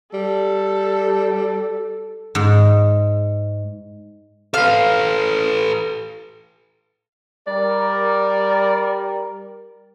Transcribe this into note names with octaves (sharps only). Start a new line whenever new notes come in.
G3 A4
G#2
A4 B4 F5
G3 A#4 D5